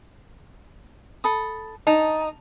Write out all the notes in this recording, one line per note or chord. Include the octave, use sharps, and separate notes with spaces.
A4 B5 D#6
D#4 A5